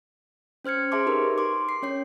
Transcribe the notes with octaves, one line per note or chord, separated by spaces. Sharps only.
C#4 C5 F6 G#6 C#7
G#4 E5 A5 C6 D6
D#4 G4 A#4 B4
C6 D6
C7
C#4 C#5 C7